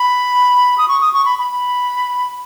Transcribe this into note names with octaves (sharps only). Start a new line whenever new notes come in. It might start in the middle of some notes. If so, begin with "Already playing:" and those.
Already playing: B5
D#6
C#6
D#6
C#6
B5
B5